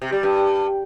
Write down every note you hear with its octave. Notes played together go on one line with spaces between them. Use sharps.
C3
G3
G2